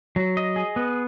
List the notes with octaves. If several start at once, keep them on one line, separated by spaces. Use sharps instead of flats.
F#3
D#5
G#4
B3